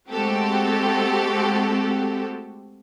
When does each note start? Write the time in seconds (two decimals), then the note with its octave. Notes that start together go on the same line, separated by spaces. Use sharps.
0.10 G#3 A3 C4 F#4 G4 A4